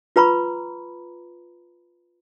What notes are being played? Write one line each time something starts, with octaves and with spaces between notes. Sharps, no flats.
F4 B4 A#5 B5 C#6